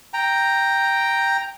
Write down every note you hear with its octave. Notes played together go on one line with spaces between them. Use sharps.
G5 A#5